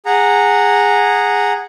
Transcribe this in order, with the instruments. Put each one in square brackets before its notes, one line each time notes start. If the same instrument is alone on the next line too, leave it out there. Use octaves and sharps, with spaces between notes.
[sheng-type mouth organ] G#4 F#5 A#5